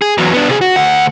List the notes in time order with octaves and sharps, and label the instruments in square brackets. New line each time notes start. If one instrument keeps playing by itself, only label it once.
[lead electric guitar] G#4
E2 F#3
B3 D4
C3 G#4
F#4
D2 F#5